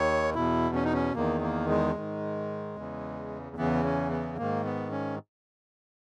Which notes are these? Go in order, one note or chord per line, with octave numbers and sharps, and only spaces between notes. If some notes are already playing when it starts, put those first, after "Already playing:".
Already playing: D#2 D#3 C#5
E2 B2 E4
C#4
D#4
C#4
E2 D#3 A#3
A#3
G#3
G#2 D#3
E2 C#3 E3
E2 C#3 E3 B3
C#4
B3
G#2 D#3 A#3
B3
C#4